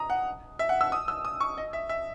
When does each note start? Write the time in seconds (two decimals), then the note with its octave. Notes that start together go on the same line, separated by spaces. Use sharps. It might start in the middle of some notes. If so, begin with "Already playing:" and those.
Already playing: A#5 D#6
0.10 F#5
0.59 E5
0.69 F#5
0.81 E6
0.92 D#6
1.08 E6
1.25 D#6
1.40 C#6
1.58 D#5
1.73 E5
1.89 E5